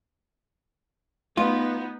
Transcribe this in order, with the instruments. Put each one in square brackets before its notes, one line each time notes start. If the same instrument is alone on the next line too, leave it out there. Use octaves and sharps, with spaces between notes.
[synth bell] A3 [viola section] B3 D#4 [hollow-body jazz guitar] F4